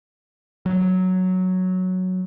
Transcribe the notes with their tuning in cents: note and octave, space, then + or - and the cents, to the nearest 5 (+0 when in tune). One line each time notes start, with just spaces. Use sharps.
F#3 +0